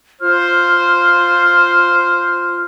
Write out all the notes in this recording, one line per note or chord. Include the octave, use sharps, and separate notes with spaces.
F4 C5 F6